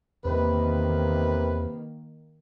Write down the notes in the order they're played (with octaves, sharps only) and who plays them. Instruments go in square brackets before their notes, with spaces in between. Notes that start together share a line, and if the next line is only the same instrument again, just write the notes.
[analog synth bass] E2 [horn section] C3 B4 [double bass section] D#3 A#3